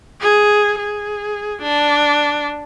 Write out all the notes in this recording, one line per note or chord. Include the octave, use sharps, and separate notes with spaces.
G#4
G#4
D4